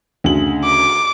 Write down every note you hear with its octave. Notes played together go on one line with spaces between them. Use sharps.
D2 C#3 F#7
D6